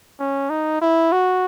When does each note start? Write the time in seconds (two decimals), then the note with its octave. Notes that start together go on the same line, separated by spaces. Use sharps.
0.20 C#4
0.50 D#4
0.82 E4
1.12 F#4